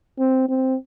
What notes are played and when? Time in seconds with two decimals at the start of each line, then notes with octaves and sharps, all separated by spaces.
0.19 C4
0.49 C4